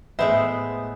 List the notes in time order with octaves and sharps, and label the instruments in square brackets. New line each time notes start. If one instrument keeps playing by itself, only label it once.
[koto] A2 G#3 C5 [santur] B3 [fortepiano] E5